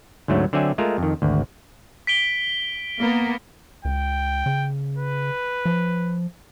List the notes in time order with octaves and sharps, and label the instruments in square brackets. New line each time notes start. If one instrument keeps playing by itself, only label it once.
[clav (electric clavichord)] D2 G#2 F#3 A3 C#4
D3 F#3 C4 D5 E5 G#5
G#3 A3 F4 A#4
F2 D#3
G#1 D2
[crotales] B6 D7 G7
[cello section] A#3 B3 A#4
[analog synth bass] C#2 [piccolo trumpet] G5
[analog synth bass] C#3
[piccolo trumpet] B4
[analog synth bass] F3